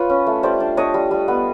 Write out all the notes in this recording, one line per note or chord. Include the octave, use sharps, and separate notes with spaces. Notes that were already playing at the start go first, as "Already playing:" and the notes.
Already playing: F4 B4 C#5
C#4
A3
G3 C5 D5
D4
D4 C#5 D#5
G3
G3
B3